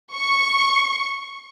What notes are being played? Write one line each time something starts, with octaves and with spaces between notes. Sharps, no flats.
C#6